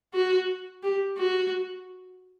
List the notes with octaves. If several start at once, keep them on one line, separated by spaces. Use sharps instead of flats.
F#4
G4
F#4